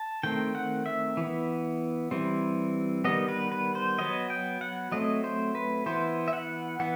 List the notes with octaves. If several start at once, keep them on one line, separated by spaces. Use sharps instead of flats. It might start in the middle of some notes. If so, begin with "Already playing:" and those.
Already playing: A5
D#3 A3 C4 G5
F#5
E5
E3 B3
E3 G3 C4
D#3 G3 B3 D#5
B4
B4
C5
F#3 B3 D#5
G5
F#5
F#3 A3 C4 D#5
C5
B4
E3 B3 C5
E5
F#5
E3 B3 F#5